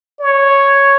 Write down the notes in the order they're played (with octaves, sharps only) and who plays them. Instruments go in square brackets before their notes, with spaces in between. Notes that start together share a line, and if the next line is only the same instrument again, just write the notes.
[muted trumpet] C#5